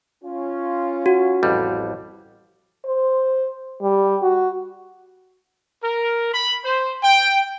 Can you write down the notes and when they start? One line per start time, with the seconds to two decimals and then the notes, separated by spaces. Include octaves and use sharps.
0.24 C#4 F4
1.06 F#4
1.43 A1 F2 G3
2.85 C5
3.82 G3
4.23 F#4
5.82 A#4
6.33 B5
6.63 C5
7.03 G5